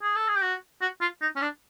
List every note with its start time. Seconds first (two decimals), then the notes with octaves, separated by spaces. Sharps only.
0.02 G#4
0.16 A4
0.28 G#4
0.36 G4
0.42 F#4
0.81 F#4
1.01 F4
1.22 D#4
1.36 C#4
1.42 D4